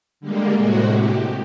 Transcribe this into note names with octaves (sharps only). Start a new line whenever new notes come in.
D3 G3 G#3 A#3
A2 C3 G#3 F#4
G4